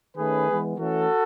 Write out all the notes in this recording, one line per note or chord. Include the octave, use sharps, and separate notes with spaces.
D#3 A3 C#4 G#4 B4
E3 G#3 B3
E3 A3 C#4 F#4 A4